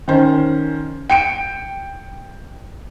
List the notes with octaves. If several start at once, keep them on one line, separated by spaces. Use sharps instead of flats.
D#3 C#4 C5
G5 C#7 D7